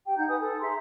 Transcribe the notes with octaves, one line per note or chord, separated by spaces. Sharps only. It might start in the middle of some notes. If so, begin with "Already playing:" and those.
G4 G5
D#4 F#5 A#5 G6
B4 G#5 D#6
A4
G#4 E5 A#5 C6